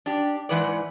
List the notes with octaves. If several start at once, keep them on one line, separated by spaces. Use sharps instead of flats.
D4 G4
G#2 E3 B4 D5